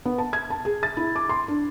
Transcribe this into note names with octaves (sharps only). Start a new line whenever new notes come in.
B3
A5
G#6
A5
G#4
A6
E4
D6
C6
D4